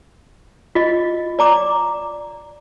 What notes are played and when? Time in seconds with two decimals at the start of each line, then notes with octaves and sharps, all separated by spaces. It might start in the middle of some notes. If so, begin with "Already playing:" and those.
0.75 F4 D#5
1.39 D5 A#5 D6